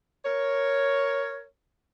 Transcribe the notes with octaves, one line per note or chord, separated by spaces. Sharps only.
A#4 C#5